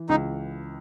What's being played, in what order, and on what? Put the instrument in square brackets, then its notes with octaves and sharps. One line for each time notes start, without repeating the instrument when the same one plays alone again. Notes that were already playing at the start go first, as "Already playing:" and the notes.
Already playing: [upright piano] E3
[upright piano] C#2 [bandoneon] D#4